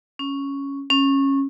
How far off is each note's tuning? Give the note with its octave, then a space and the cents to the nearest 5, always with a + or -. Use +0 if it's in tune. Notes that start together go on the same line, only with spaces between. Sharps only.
C#4 +0
C#4 -15